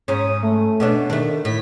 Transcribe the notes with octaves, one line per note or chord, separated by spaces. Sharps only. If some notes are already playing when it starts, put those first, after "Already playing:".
G#2 C#4 D#6
A3
B2 C#4 D4
D#3 A3 D4
A2 B6